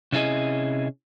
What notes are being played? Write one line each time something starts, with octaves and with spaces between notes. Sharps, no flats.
C3 C#4 E4 G#4 D#5